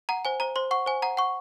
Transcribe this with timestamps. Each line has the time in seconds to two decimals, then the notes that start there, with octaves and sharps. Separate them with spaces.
0.09 F#5 A#5
0.25 C5 G#5
0.40 C5 A#5
0.56 C5 C6
0.71 F#5 C#6
0.86 C5 G#5
1.02 F#5 A#5
1.17 F#5 C#6